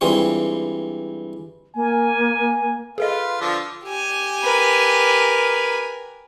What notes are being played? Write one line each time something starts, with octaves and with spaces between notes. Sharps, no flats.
G2 E3 G3 G#3 C4 F4
A#3 G#5
F4 G#4 A4 B4 D#5
D3 F3
G4 G#5
A#4 B4